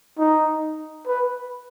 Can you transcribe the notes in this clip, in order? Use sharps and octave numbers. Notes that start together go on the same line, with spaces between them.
D#4
B4